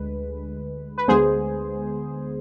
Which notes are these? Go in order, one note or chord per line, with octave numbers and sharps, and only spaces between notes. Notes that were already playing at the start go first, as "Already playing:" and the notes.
Already playing: D2 D3 G#3 B4
B4
D2 D3 G#3 B3 G#4 C5